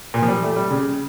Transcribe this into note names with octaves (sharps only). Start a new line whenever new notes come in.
A#2
F3
G3
A3
G3
C#3